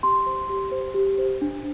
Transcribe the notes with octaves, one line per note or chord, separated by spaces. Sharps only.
G4 C6
C5
G4
C5
G4
C5
D4